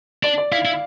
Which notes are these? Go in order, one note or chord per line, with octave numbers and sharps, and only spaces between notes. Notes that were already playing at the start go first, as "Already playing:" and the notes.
D4 D5
D5
E4 F5
E4